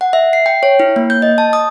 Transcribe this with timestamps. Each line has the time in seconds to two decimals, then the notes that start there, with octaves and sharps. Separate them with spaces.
0.01 F#5
0.13 E5
0.33 C7
0.46 G5
0.63 C#5
0.80 E4
0.96 A#3
1.10 G6
1.22 D#5
1.38 A5
1.53 D#6